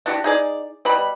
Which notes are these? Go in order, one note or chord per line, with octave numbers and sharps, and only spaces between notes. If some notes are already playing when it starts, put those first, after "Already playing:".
D4 F#4 G4
D#4 G#4 D5
B2 G3 B5